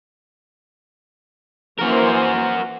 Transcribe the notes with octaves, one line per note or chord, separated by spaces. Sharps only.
E3 A#3 F#4 A#4 C5